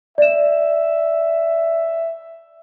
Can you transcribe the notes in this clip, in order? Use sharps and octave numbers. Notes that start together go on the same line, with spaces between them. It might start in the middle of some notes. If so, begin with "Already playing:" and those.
D5 E5 E7